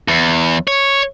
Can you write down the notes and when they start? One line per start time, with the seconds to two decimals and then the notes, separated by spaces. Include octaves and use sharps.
0.08 E2
0.67 C#5